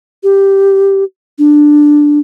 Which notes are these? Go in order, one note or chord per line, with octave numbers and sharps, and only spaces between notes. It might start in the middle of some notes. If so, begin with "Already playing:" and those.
G4
D4